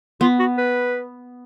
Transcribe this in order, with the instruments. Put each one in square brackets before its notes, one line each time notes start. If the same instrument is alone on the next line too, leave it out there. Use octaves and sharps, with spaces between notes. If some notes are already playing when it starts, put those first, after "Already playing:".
[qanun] B3 [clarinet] F4
[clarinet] F#4
B4